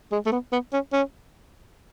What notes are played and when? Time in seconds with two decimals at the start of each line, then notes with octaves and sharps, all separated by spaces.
0.12 G#3
0.26 A3
0.32 B3
0.52 B3
0.73 C#4
0.93 C#4